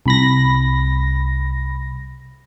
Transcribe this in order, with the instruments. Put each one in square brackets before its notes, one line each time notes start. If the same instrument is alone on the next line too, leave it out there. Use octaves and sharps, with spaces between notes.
[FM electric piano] C2 B5 A#6